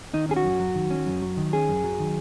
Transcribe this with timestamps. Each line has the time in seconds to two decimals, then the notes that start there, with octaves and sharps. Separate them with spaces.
0.13 D#3 D#4
0.29 C#4 G#4
0.36 F#4
0.44 F#2
0.60 F#3
0.75 D#3
0.90 C#4
1.06 F#2
1.22 F#3
1.37 D#3
1.53 C#4 G#4
1.69 F#2
1.84 F#3
2.00 D#3